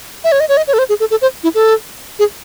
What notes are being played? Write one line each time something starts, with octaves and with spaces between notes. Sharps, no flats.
E5
C#5
D#5
C#5
D#5
C#5
A4
C5
G#4
A4
A4
C5
E4
A4
G#4